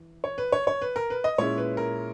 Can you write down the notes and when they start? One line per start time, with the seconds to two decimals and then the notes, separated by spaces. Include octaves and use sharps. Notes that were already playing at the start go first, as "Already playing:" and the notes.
Already playing: E3
0.24 C#5
0.38 B4
0.52 C#5
0.67 C#5
0.82 B4
0.96 A#4
1.10 B4
1.24 D#5
1.38 A#2 G#3 C#4 E4 C#5
1.58 B4
1.77 A#4